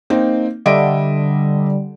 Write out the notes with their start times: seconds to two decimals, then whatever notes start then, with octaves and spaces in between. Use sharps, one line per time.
0.10 A#3 C4 D#4
0.66 D3 G3 D#5 E5 D7